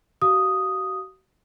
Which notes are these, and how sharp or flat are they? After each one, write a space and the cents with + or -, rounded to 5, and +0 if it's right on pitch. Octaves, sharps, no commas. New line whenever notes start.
F#4 +40 F5 +0 D#6 +0